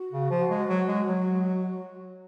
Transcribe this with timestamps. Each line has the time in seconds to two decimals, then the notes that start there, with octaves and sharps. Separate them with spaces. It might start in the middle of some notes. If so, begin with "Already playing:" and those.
Already playing: F#4
0.12 C#3
0.30 F3
0.50 G#3
0.68 F#3
0.88 G#3
1.07 F#3